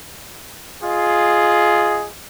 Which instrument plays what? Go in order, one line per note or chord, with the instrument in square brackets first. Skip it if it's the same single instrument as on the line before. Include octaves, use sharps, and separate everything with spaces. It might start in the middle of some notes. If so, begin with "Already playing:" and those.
[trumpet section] F4 G#4 D#5